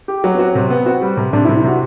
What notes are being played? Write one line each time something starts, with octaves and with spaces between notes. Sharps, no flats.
G4
F#3
B3
C4 F#4
C3
B3
C4 F#4
G3
C3
C3 D4
E4
C3
E4
C3 F#4